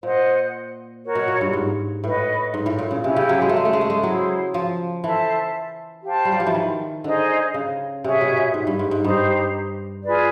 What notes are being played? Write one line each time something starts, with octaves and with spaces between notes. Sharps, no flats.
A#2 C5 D#5 F#5
F#4 A#4 C#5
B2
A#2
G2
G#2
A2 F#4 B4 D#5
G#2
A2
A#2
C#3
C3 C#4 E4 G4
C#3
F#3
G#3
A3
G#3
A3
G#3
A3
G#3
F#3 E4 G#4 C5
F3
E3 A4 C5 E5 A5
G4 C5 F5 A5
G3
F#3
F3
E3
D#3
D3 D#4 G#4 C5 D#5
C#3
C3 G#4 C#5 E5
B2
A#2
G#2
G2
G#2
G#2
G2 D#4 G4 C5
F4 G#4 B4 D5